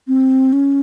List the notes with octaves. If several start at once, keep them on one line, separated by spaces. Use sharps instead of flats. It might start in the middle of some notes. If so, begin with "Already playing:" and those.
C4
C#4